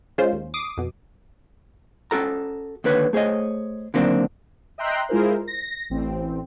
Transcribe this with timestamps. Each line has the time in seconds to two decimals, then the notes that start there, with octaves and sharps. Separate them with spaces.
0.18 G#3 C#4 F4 C5
0.33 D#2
0.54 D6 D#6 C7
0.77 F2 B2
2.11 C#4 F#4 A4 A#5
2.84 D#2 D3 B4 C#5
3.13 A3 G#4 C5 C#5 D#5
3.94 D3 D#3 F#3 A#3 C4 D4
4.78 D#5 E5 G5 A#5 C6 F#6
5.09 G#3 E4 F4 G#4 A#4 C5
5.48 A#6
5.90 A1 C4